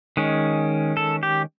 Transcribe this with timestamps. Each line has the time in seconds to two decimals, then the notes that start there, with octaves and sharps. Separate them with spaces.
0.17 D#3 G#3 C#4
0.97 A4
1.23 G4